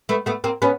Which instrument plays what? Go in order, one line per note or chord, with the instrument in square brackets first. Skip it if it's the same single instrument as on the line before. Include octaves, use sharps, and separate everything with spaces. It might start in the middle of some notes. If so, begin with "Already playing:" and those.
[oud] A3 B3
A3 B3
A#3 C4
B3 C#4